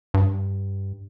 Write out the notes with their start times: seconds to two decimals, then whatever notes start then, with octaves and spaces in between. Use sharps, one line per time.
0.14 G2